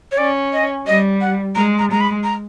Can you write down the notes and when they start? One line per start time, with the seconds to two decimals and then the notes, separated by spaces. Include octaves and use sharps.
0.12 C#5
0.18 C#4 D5
0.53 D#5
0.87 G3 D#5
1.21 F#5
1.55 G#3 A#5
1.79 A#5
1.90 G#3 A#5
2.01 B5
2.24 A#5